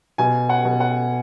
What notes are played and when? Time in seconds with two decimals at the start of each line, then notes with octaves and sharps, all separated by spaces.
0.18 B2 G#5
0.49 F#5
0.65 B2
0.80 F#5